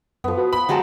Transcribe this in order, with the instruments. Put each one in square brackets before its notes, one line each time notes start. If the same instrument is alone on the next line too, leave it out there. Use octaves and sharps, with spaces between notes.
[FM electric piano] F#2 A4 [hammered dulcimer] F3 B3
[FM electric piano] F#4 B4
[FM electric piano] B4 [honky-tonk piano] B5
[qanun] F#3 G#3 G4 [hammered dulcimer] A5 A#5 C6